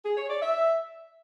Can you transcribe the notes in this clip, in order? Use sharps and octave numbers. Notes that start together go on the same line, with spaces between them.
G#4
C#5
D5
E5